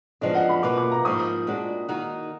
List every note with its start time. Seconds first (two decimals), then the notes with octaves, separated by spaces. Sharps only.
0.21 F#2 F3 G#3 B3 D4 D#5
0.35 F#5
0.49 B5
0.63 B2 A#3 F4 B4 D6
0.77 D6
0.91 A#5
1.05 G#2 F3 A#3 D#6
1.47 A#2 G#3 D4 F#4
1.88 D#3 A#3 D#4 F#4